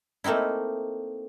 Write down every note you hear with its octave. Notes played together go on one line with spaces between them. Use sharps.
A3 A#3 C4 D#4 E4